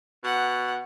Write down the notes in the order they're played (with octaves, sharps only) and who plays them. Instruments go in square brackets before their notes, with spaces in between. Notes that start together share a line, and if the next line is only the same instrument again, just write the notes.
[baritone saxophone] B2 [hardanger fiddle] F#5